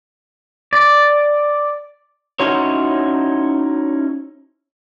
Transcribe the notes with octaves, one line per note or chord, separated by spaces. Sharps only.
D5
C#4 D#4 E4 F#4 C5 C#5